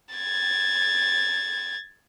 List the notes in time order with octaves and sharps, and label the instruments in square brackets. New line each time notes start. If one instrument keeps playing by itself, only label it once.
[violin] G#6 A6